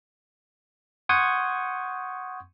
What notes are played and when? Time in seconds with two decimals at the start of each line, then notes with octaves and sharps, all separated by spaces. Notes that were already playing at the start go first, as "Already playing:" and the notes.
1.09 F#5 C6 C#6 D#6 G6 G#6